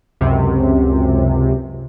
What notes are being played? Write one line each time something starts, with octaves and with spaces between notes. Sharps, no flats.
C#2 F#2 C3